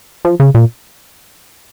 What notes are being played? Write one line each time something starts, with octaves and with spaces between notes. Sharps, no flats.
F3
C#3
A#2